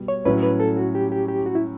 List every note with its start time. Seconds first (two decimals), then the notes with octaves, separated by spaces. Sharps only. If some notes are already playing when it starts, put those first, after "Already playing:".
Already playing: B2 G3
0.08 C#5
0.25 A2 F#3 C#4 E4 B4
0.43 B4
0.60 A4
0.77 F#4
0.95 G4
1.12 G4
1.28 G4
1.46 F#4
1.55 E4